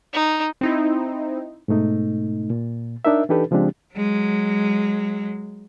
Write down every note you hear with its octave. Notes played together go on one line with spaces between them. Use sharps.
D#4
C4 D#4 E4
G#2 B2 A3 D#4
A#2
D4 D#4 A#4 E5
E3 D4 D#4 G4 A4 B4
C#3 F3 G#3 C4 D4 G4
F#3 G#3